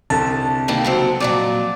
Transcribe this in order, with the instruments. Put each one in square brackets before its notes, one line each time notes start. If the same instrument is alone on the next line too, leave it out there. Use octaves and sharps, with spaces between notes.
[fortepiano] C2 D3 [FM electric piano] A5
[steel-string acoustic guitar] D#3 G3 A#3
C#3 F#3 C4
[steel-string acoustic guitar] F2 A#2 F#3 [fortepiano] D5 D6